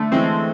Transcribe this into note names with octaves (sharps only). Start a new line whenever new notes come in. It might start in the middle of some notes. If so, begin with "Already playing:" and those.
Already playing: D3 A3
E3 G#3 C4